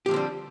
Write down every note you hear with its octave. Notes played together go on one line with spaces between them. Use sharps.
D3 F3 G3 C4 G4